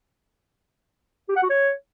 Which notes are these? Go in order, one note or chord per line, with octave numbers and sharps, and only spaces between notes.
G4
F#5
F#4
C#5